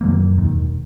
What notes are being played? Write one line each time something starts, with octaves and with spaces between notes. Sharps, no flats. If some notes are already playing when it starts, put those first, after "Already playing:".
F#2 D#3 F#3 A#3
E1 D#2 D#3